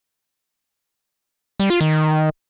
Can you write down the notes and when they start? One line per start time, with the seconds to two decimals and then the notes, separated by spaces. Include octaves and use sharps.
1.60 G3
1.70 F4
1.81 D#3